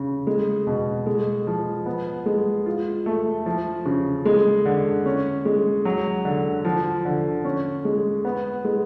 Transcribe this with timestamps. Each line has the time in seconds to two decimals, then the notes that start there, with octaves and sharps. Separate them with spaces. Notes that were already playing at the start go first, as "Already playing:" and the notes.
Already playing: C#3
0.27 G#3
0.67 B2
1.06 G#3
1.47 F3
1.86 B3
2.26 G#3
2.66 F4
3.06 A3
3.46 F3
3.86 C#3
4.25 G#3
4.66 D3
5.06 C#4
5.45 G#3
5.85 F#3
6.25 D3
6.65 F3
7.05 D3
7.45 C#4
7.85 G#3
8.25 B3
8.65 G#3